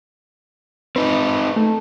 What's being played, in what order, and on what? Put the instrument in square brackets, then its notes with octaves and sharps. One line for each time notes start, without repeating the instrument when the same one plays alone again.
[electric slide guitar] C4 D#4 [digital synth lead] B4
[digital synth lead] A3